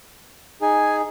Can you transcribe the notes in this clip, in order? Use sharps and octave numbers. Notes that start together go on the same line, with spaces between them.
D#4 G#4 G#5